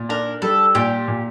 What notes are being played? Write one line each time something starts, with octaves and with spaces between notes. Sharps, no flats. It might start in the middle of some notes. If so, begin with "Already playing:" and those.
Already playing: A#2
D4 A#4
G3 A4
A#2 G4
A#2